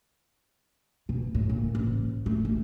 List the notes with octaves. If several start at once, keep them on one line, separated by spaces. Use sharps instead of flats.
B2
A2
A#2
A1
A3
A#1